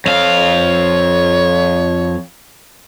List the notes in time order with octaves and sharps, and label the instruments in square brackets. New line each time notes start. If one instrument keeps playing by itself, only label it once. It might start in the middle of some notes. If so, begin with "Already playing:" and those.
[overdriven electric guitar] F2 F5 [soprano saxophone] C#5